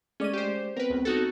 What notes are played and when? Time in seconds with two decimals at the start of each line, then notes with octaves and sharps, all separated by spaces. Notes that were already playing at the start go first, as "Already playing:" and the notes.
0.20 G#3 A3 C#4 D5 D#7
0.34 G4 C5
0.77 B3 C4 A#4 B4
0.90 C#2
1.05 D#4 F#4 A4